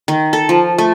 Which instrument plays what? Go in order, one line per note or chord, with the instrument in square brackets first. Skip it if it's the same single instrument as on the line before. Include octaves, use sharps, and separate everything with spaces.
[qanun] D#3
A4
F3
A3